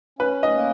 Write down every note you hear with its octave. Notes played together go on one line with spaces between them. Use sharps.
C#4 B4
D#5
A#3